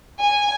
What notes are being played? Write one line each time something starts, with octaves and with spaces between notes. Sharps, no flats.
G#5